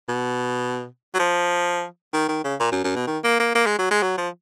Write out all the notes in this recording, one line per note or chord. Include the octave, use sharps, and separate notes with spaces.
B2
F#3
F3
D#3
D#3
C#3
A#2
F#2
F#2
B2
D#3
A#3
A#3
A#3
G#3
F#3
G#3
F#3
F3